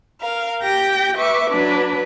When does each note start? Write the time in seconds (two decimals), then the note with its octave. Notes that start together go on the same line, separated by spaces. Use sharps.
0.20 A#4 F5
0.62 G4 G5 G6 A#6
1.18 B4 E5 C#6 D6
1.50 F#3 D4 B4